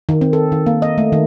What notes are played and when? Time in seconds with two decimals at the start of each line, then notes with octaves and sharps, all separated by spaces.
0.09 D#3
0.21 C4
0.33 A4
0.52 D#3
0.66 A#3
0.82 D#5
0.98 A3
1.12 D#3